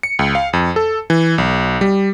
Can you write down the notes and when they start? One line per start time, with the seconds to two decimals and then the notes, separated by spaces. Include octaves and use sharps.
0.03 C#7
0.19 C#2
0.35 F5
0.53 F2
0.76 A4
1.10 E3
1.38 B1
1.81 G3